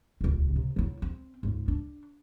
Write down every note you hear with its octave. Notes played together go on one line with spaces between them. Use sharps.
D#1 C#2
C3
F#3 E4
C4
C#2 G#2
D4